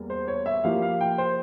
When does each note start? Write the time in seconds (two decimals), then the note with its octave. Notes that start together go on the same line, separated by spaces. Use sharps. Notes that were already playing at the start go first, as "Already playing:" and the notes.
Already playing: E2 G3 A#3
0.10 C5
0.28 C#5
0.46 E5
0.64 F3 A#3 E4 G4 F5
0.82 F5
1.01 G5
1.18 C5